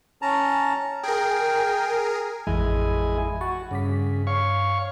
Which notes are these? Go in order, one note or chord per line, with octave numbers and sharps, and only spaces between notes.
C#4 A5 A#5
G#4 A#4 G5
A1 F2 E3 G#3 E4 G#5
F#4 B5 C#6 A6
G2 C#3 D6 B6
C#5 F5 C#6